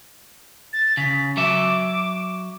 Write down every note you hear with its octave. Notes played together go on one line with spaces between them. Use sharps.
A6
C#3 B6
F#3 E5 D6